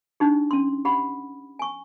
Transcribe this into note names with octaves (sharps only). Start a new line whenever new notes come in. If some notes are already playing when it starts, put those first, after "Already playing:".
D4 D#4 G4
C#4 C6
G4 F#5 B5
G#5 C#6